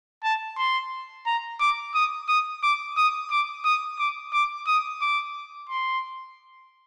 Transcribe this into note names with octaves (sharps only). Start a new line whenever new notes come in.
A5
C6
A#5
D6
D#6
D#6
D6
D#6
D6
D#6
D6
D6
D#6
D6
C6